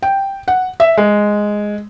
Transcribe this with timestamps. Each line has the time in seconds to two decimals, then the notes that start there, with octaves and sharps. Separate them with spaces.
0.03 G5
0.48 F#5
0.80 E5
0.97 G#3